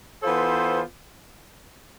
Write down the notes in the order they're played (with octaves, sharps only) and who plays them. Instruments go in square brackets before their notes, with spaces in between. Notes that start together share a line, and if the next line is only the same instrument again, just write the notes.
[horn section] E3 B3 F4 A4 C5